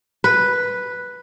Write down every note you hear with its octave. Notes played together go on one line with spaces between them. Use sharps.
B4